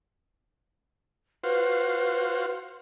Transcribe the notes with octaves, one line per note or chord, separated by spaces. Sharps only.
F4 F#4 B4 C5